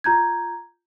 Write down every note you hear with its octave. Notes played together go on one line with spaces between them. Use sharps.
F4 A#5 G6 G#6